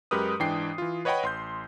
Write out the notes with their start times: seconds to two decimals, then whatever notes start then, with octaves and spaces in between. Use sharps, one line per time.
0.11 F#2 G#3 G4 A#4 B4 D#6
0.40 G#2 E3 D4 G5 C7
0.78 E3 F4
1.05 B4 C#5 D#5 F#5 G5 B5
1.23 A1 C6 G6